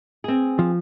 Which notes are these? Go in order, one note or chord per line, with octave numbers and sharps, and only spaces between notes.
C4 G#4
F3